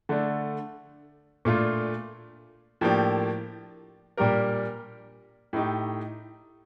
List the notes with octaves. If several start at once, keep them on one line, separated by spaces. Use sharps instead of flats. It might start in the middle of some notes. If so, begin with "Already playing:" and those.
D3 A3 D4
A#2 A3 D4 F4
A2 F3 A#3 D4 G4
A#2 G3 D4 G4 A#4
A2 A3 D#4 G4